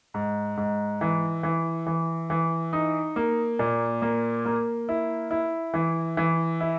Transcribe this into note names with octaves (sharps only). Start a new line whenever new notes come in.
G#2
G#2
E3
E3
E3
E3
D#4
A#3
A#2
A#3
A#3
E4
E4
E3
E3
E4